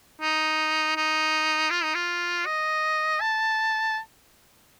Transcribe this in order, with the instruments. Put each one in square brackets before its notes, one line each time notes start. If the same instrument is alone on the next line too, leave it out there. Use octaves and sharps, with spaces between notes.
[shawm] D#4
D#4
F4
D#4
F4
D#5
A5